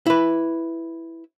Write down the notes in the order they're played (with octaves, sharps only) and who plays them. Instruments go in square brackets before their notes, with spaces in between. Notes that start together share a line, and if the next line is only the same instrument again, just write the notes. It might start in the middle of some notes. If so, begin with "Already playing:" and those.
[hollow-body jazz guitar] E4 B4